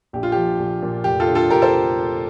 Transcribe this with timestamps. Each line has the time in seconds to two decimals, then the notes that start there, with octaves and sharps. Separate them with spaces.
0.13 A#1 G4
0.23 F4
0.32 F3 G4
0.59 A#1
0.82 A#2
1.04 F1 G4
1.20 F4 A4
1.28 D3
1.35 F4 A4
1.50 F1 G4 A#4
1.62 A4 C5